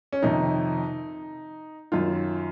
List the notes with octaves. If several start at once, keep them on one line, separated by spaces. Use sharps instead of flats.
C#4
F2 C3 D#3 D#4
F#2 D#3 F4